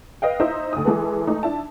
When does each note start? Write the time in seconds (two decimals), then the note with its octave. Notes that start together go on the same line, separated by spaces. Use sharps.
0.22 B4 D#5 F5 G5
0.40 D#4 E4 C5 D#5 E5
0.73 D2 D#6
0.85 E3 G#3 A4 B4
1.27 A3 D#4
1.43 D4 E4 A5